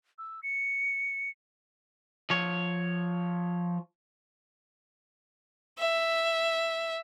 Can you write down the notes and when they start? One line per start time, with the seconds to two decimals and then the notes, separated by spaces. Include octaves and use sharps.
0.18 E6
0.43 C#7
2.30 F3 C#5
5.79 E5